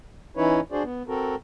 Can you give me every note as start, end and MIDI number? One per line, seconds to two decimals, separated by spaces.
0.37 0.60 52
0.37 0.60 61
0.37 0.60 63
0.37 0.60 64
0.37 0.60 71
0.37 0.60 73
0.72 0.83 62
0.72 0.83 66
0.72 0.83 68
0.72 0.83 72
0.72 0.83 74
0.83 1.03 59
1.08 1.35 60
1.08 1.35 66
1.08 1.35 69
1.08 1.35 70